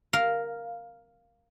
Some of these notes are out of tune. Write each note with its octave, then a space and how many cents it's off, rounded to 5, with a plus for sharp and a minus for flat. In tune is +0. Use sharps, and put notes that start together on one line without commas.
A#4 +0 F5 +0